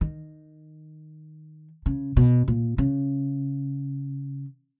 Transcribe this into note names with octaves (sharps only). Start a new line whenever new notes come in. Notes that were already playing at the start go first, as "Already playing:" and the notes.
D#3
C#3
B2
A#2
C#3